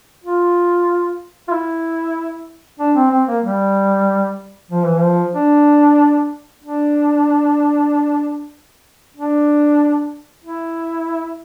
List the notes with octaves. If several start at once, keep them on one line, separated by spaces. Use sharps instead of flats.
F4
F4
E4
D4
C4
C4
A#3
G3
F3
E3
F3
D4
D4
D4
E4